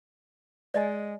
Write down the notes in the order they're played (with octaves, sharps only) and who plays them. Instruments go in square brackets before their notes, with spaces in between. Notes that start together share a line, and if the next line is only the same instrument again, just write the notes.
[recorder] G#3 [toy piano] D5 D#5 G#5